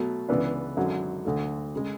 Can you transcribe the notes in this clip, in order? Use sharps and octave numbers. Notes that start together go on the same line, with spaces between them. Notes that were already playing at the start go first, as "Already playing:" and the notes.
Already playing: B2 F#3 A3
C#2 C#3 E3 B3 D4
G#1 F#2 D3 F#3
D2 D3 A3
C#3 G#3